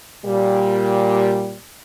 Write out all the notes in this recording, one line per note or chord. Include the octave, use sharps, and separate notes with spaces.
A#2 G3